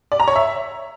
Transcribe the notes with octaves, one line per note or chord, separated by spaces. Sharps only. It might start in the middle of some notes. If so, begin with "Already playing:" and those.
D5
A#5
C#5
E5